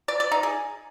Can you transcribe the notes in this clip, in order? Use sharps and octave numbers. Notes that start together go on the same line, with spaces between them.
D5
D5
D#4
G#4